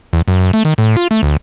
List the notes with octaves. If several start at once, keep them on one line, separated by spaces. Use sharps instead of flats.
E2
F#2
F#2
A3
D#3
A2
F4
A3
D2